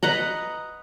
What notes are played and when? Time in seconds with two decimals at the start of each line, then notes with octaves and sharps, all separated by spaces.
0.03 B4 D#5 F#5 A#5